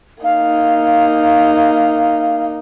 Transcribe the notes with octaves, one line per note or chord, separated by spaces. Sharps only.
A#3 D#4 F5